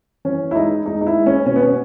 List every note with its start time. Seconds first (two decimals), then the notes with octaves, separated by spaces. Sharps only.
0.25 E3 C#4
0.51 E4
0.55 G#3 D#4
0.85 G#3 D#4
1.01 D#4
1.06 E4
1.16 G#3
1.26 C#4
1.46 B2 C#4
1.56 B3
1.62 C#4